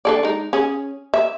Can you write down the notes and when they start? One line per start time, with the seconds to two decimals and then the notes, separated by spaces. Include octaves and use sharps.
0.05 D4 A4 D5
0.23 G#3 D#4
0.53 C#4 G#4
1.14 E5